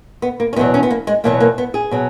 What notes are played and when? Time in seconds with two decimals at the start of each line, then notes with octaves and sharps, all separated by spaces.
0.22 B3
0.40 A#3
0.53 C#4
0.56 E2 B2 F#3 B3
0.74 C#4
0.83 B3
0.90 A#3
1.07 G#3
1.24 E2 B2 F#3 A#3
1.40 A#3
1.58 B3
1.74 G#4
1.91 B2 F#3